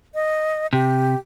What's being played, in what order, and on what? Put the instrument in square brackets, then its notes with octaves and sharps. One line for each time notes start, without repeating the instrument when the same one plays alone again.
[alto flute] D#5
[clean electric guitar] C3 [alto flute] G4